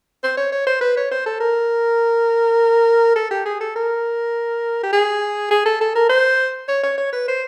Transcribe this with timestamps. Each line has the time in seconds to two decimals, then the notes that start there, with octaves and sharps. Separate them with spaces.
0.23 C5
0.37 C#5
0.52 C#5
0.67 C5
0.81 B4
0.97 C#5
1.11 C5
1.26 A4
1.40 A#4
3.16 A4
3.31 G4
3.45 G#4
3.61 A4
3.76 A#4
4.83 G4
4.93 G#4
5.51 G#4
5.66 A4
5.81 A4
5.95 A#4
6.09 C5
6.68 C#5
6.83 C#5
6.98 C#5
7.12 B4
7.28 C5